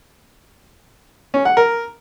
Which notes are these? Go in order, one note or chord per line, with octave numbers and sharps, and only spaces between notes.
C#4
F#5
A#4